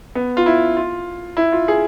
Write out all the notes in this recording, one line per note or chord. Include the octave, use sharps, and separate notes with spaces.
B3
F4
E4
F4
E4
F4
G#4